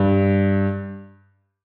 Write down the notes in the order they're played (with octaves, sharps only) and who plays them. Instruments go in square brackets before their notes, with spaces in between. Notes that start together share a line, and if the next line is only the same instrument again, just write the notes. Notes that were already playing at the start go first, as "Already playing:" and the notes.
Already playing: [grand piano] G2